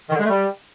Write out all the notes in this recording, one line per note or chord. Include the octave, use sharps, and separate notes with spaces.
D#3
D3
G#3
A3
G3